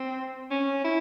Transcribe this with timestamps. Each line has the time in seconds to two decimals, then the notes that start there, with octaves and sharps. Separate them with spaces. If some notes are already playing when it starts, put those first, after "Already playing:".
Already playing: C4
0.50 C#4
0.84 E4